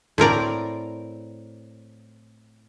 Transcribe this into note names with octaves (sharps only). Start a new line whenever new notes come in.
A2 C4 A#4 D5